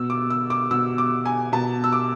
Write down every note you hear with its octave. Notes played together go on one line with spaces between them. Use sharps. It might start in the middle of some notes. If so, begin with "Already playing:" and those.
Already playing: B2 E6
D6
E6
D6
B2 E6
D6
G#5
B2 A5
E6
D6